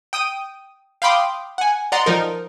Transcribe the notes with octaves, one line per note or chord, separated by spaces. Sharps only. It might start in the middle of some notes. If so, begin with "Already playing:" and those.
G5 D#6 D#7
F5 G5 B5 C6 D6 D#6
F#5 G#5
D5 D#5 F#5 A#5 C6
F3 D#4 A#4